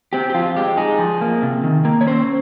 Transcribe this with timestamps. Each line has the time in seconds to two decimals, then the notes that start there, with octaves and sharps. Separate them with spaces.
0.13 C4 G4
0.30 G4
0.34 F3 F4
0.57 G#3 G4
0.77 D#4 G#4
0.99 F3
1.21 A#3
1.43 C3
1.64 D#3
1.85 A#3
2.01 C#5
2.07 C#4 C5